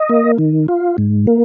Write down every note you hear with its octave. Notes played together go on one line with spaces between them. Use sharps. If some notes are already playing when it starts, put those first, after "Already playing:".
Already playing: D#5
A#3
D#3
F4
G#2
A#3